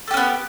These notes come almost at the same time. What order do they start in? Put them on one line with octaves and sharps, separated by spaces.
A4 G4 C#4 B3